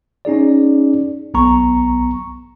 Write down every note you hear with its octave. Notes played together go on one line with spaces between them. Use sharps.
C#4 D#4 G#4 D5
B1 B3 A#5 C#6